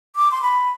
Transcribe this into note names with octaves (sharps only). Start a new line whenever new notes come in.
D6
C6
B5